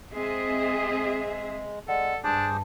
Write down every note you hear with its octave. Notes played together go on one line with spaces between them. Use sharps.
G#3 C4 G#4 D#5 E5
G#3 A4 D5 F#5
G2 D4 G#4 C5 A5 D6